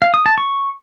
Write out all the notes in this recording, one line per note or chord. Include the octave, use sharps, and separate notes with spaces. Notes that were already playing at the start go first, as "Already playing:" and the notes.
F5
D#6
A5
C#6